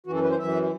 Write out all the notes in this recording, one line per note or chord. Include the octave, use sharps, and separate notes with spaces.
F#2 E3 F#4
A4
B4
C5
F#2 E3 E5